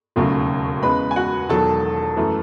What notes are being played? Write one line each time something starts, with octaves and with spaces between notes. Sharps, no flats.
E1 D#2 C#3 F#3 A3
E2 C#3 G#3 B4 B5
G#5
F#4 F#5
E1 E2 D#3 F#3 A4 A5
F#2 E3 A3